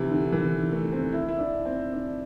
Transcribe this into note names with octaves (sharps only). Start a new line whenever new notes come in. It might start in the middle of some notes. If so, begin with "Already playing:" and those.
Already playing: C3 E3
D3
E3
A3
C4
E4
E4
D4
C4
D4